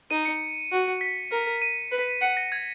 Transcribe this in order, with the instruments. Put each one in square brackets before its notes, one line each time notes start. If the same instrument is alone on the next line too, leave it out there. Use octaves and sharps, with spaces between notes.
[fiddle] D#4 [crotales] D#7
[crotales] C#7
[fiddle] F#4
[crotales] B6
[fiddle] A#4
[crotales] D#7
[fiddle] B4
[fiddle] F#5 [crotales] C#7
[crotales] A#6
G#6